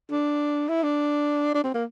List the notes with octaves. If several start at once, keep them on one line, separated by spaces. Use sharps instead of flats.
D4
E4
D4
D4
C4
A#3